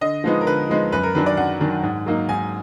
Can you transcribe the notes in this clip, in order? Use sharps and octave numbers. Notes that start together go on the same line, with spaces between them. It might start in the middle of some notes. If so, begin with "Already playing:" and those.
D3 D#5
F3 G#3 B3 D#4
A#4
D3 B4
F3 G#3 B3 D#4
F#2 B4
A#4
D#3 F#3 D4 B4
D5
F#2 F#5
D#3 F#3 D4
G#2
F#3 A#3 D#4
G#2 G#5